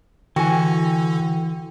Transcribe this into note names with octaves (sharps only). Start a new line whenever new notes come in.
D3 E3 F#4 G5 G#5